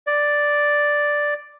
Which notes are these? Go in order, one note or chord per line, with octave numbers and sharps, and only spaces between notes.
D5